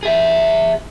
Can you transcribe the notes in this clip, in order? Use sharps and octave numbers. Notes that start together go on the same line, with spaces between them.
G#4 E5